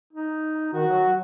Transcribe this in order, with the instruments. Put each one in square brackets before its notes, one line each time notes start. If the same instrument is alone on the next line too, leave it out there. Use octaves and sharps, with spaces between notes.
[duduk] D#4
[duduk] D#3 [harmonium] F#4
[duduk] F#3